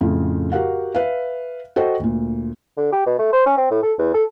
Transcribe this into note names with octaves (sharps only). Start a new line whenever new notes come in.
F2 A2 C#3 F4
F#4 G4 A#4 F5 F#5
B4 E5 F5
F#4 A4 C5 D#5 G5
D2 A#2
D3
G4
B2
A3
C5
C#4
C4
A2
A4
E2
A4